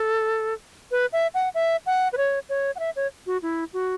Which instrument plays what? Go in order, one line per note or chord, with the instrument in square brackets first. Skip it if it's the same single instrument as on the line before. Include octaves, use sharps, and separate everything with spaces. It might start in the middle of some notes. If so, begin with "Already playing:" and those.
Already playing: [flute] A4
B4
E5
F#5
E5
F#5
B4
C#5
C#5
F#5
E5
C#5
F#4
E4
F#4